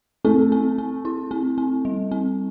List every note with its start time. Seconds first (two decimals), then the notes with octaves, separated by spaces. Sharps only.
0.24 A3 C4
0.52 C4
0.78 C4
1.05 E4
1.31 C4
1.58 C4
1.85 G3
2.11 C4